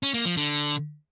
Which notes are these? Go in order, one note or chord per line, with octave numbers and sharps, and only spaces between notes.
C#4
A#3
F3
D3